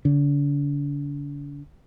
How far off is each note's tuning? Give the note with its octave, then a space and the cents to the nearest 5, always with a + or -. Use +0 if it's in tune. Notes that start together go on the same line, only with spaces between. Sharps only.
D3 -40